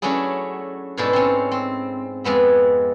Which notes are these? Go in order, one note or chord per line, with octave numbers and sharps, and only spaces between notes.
F#3 A3 C#4 D4 E4 G#4
G#2 B2 G#3 D4 E4 A4
C4 C#4
C4
F2 G#3 B3 E5